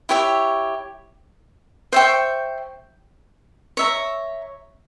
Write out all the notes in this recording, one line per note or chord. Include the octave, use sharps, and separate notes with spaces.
E4 G4 C#5 E5
C5 E5 G5 C#6
C#5 E5 A#5